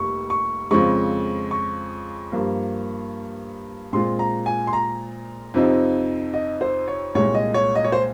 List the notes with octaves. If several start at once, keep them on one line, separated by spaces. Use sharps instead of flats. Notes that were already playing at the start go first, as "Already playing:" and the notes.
Already playing: F1 F2 G3 A#3 C#6
C#6
F2 C#3 F3 G#3 C#6
C#6
G2 F3 A#3
A#2 G#3 C4 F4 C6
A#5
G#5
C6
A#5
F2 C3 F3 C4 D#4
D#5
C5
C#5
C2 A#2 G#3 C#5
D#5
C#5
D#5
C#5
C5